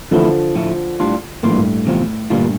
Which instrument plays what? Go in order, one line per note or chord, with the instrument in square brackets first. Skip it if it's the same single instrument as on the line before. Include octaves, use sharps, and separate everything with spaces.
[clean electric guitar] F2 E3 A3 E4 [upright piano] D3 F3
[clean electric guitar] A2 F3 A3
A2 G3 D4 F4
[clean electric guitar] F2 E3 A#3 F4 [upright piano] A2
[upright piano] G2
A2
[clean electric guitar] E2 C3 F3 C4 F4
[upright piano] G2 A#2 [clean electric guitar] D3 G3 A#3 F4